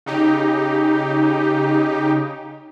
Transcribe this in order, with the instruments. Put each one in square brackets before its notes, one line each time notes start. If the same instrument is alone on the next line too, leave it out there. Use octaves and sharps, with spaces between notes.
[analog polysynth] C#3 D#4 G4